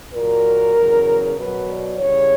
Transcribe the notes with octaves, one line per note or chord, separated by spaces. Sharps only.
A#2 F#3 A#4
E2 C#3 F#3
B2 F#3 B4
D5
E2 C#3 G3 C#5